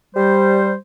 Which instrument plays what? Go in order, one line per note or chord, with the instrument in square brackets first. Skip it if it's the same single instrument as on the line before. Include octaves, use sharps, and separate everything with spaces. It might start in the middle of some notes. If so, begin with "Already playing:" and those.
[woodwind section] G3 C5